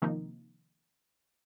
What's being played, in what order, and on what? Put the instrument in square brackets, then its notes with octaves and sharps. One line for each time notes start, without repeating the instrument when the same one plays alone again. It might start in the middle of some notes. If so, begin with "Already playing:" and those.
[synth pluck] C3 D#3 F3 A#3 C4 D#4